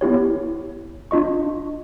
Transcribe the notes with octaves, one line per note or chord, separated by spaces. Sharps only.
B3 E4 G4 C#5
D4 F4 D#5 C#6